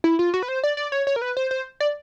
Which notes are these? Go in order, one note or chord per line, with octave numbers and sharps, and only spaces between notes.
E4
F4
F#4
B4
C5
D5
D5
C#5
C#5
A#4
B4
C5
C5
D5